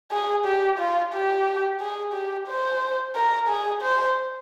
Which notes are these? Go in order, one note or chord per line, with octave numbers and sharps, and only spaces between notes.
G#4
G4
F4
G4
G#4
G4
C5
A#4
G#4
C5